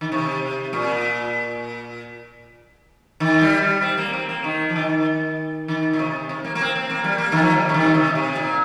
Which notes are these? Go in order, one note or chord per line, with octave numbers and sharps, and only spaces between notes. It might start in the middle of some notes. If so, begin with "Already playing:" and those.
D#3
C3
A#2
D#3
G3
G3
C4
A#3
C4
A#3
D#3
F3
D#3
D#3
A#2
C3
C3
A#3
A#3
C4
C4
A#3
G3
A#3
D#3
F3
G3
C3
D#3
A#2
C3
C3
A#2